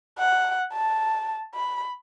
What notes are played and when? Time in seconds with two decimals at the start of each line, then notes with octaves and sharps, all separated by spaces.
0.19 F#5
0.73 A5
1.55 B5